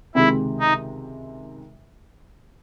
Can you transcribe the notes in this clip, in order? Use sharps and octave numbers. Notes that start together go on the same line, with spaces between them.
C#2 C3 D#3 G#3 C4 E4
D#4